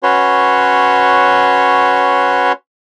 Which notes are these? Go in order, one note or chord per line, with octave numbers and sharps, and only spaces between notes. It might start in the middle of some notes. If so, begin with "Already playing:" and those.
C#4 F#4 B4 C#5 C6